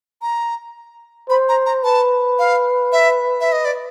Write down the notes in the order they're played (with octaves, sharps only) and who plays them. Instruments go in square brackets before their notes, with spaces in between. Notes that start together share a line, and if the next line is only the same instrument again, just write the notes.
[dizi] A#5
[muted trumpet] C5 [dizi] B5
[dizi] A#5
A#5
[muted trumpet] B4 [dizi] A5
[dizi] F5
E5
E5
D#5
D5